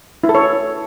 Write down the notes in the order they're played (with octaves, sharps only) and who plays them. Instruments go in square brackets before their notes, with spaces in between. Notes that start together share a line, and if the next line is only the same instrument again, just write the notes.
[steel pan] E4
A4
C#5